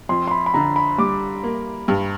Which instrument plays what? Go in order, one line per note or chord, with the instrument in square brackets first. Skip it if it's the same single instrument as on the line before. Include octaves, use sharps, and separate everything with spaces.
[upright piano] F2 [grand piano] C6
[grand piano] C6
B5
B5
[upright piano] D3 [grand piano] A#5
[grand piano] B5
[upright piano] G3 [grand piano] D6
[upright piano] A#3
G2